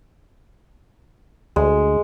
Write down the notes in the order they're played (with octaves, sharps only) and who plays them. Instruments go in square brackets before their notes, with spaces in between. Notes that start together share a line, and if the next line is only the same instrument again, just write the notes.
[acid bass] D2 [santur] G#3